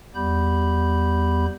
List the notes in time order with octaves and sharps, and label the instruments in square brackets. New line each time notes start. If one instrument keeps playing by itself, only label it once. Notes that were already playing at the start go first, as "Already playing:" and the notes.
[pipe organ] E2 G3 B3 G4 B5 G6